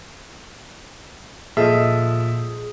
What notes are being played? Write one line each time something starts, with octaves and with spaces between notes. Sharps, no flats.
A#2 F3 G#4 A4 D#5 E5